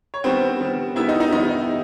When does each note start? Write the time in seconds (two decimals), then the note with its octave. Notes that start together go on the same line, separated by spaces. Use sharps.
0.14 C#5
0.24 D#3 G3 B3 C4 C5
0.60 D#3 G3 B3
0.96 D#3 G3 B3 E4 E5
1.08 D#4 D#5
1.20 D#4 D#5
1.32 D#3 G3 B3 D#4 D#5